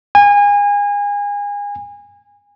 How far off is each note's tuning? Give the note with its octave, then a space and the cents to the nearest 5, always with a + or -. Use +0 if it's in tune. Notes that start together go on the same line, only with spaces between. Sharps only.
G#5 -30